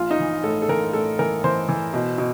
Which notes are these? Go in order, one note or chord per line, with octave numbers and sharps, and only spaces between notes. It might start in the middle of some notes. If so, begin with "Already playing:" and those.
Already playing: A#1 F4
D#4
E3
A2 A4
A4
E3 A#4
A2 A4
E3 A#4
E3 C5
E3
B2
B2